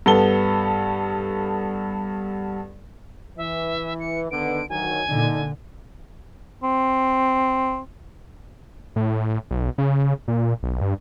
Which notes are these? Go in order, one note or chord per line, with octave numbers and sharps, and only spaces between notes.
G2 B3 A4 G7
E3 E5
C#7
D3 D#3 B3 D7
D2 D#3 F#3 G#5
A#2 D3 D4 D#4
C4
A2
B1
C#3
A#2
B1
G2